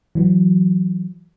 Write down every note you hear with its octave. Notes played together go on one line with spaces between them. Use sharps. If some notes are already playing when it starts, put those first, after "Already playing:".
E3 F#3